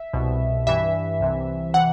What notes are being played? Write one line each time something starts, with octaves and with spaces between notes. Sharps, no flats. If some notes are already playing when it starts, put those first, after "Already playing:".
Already playing: E5
C2 B2
G2 E3 E5
C2 C3 E3
C3 E3 F#5